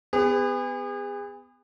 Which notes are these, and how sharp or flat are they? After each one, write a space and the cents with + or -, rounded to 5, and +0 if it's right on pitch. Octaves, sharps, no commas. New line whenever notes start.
B3 +25 G#4 -35